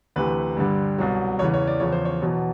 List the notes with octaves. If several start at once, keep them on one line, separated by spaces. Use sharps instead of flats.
D2 C3 E3 B4
G2 D3 G3
C2 B2 F#3
E2 C#3 E3 C#5
C#5
D5
E2 C#3 F3 C#5
C5
C#5
E2 B2 F#3